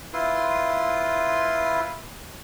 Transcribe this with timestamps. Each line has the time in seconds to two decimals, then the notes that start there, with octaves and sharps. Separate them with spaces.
0.13 E4 F4 B4 C6